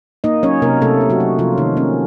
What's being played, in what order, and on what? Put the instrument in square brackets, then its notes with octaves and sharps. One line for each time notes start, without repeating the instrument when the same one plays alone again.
[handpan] A#3 D#4 D#5
F#3 C#4 C#5
C3 A#3 A#4
C3 A3 A4
A#3
F#3 F#4
F#3
C3 F3 F4
C3 D#3 D#4
A#3 C#4